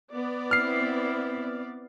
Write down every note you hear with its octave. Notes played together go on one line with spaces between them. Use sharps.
B3 D5
C4 E4 F6 C7